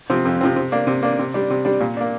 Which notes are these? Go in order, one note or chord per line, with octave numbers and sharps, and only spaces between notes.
C3 F3 C4
F2
C3 F3 C4
C3
A#3 D4
C3
A#3 D4
C3
G3 D4
C3
G3 D4
A#2
A#3 D4